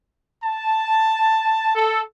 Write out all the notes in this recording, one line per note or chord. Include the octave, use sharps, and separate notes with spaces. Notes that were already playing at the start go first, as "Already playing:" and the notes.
A5
A4